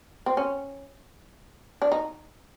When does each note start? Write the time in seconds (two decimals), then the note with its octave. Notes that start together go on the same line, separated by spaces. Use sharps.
0.26 C4
0.37 C#4
1.82 D4
1.92 D#4